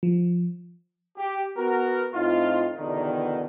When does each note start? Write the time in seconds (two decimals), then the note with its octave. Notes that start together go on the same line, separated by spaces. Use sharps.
0.03 F3
1.18 G4
1.57 B3 F#4 A#4
2.13 A2 C4 D#4 F4
2.76 E2 B2 D3 D#3